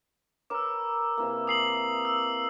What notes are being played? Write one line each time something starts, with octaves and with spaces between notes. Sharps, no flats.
A#4 B4 C#5 D6 E6
C3 E3 A#3
G#5 D#6 C7 F#7
E6